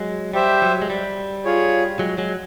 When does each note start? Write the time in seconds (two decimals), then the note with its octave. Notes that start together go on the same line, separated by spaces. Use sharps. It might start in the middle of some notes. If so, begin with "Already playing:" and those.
Already playing: F#3 G#3
0.34 G3 G4 C5 E5
0.62 F#3
0.82 G#3
0.90 G3
1.45 F4 G#4 C#5
1.99 F#3 G#3
2.18 F#3 G#3